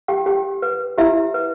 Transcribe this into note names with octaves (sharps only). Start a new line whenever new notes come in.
G4 G5
G4 G5
B4
E4 G4 E5
B4